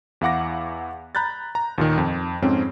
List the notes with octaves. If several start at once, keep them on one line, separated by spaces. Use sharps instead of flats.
E2 E4 F5 F#5 D6 A#6
A#5 B5 F#6 G6 A6
A#5
D#2 A#2 D#3
F2
F2 G#2 C4 C#4